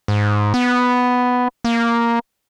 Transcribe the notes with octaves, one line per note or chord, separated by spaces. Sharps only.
G#2
B3
A#3